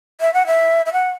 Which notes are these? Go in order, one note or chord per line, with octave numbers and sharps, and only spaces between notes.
E5
F#5
E5
E5
F#5